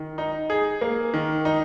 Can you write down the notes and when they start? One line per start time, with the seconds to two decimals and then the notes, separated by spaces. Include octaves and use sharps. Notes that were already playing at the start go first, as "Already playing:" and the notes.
Already playing: D#3
0.18 D#4
0.50 G#4
0.81 A#3
1.14 D#3
1.45 D#4